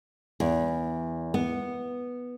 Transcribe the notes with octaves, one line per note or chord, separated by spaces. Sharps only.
E2
B3